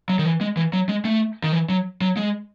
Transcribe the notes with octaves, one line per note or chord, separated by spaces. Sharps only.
F#3
D#3
E3
G#3
E3
F#3
G#3
A3
D#3
E3
F#3
F#3
G#3